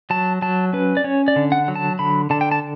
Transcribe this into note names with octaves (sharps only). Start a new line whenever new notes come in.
F#3 A5
F#3 A5
C#4 B4
D5
C#4 C#5
D5
D3
F#5
F#3
A5
D3 B5
D3 A5
G5
A5